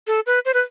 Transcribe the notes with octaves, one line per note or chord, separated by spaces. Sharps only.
A4
B4
C5
B4